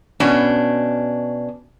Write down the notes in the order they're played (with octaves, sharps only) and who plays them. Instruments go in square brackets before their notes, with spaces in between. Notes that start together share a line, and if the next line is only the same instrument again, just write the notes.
[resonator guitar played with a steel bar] B2 C#4 D4